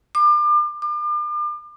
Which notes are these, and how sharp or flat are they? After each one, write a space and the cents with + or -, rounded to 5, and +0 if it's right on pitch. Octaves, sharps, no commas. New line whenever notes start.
D6 +35
D6 +40